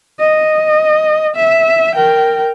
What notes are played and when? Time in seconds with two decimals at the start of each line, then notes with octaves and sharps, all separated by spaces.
0.20 D#5
1.36 E5
1.95 A#4 G5